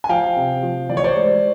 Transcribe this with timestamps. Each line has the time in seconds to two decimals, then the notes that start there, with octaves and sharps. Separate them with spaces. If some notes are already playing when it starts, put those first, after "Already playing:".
0.04 G#5
0.09 F3 F5 G5
0.36 C3
0.63 F3
0.89 E3 D5
0.97 C#5
1.04 C5 D5
1.16 G#3